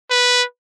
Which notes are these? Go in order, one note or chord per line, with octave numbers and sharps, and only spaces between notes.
B4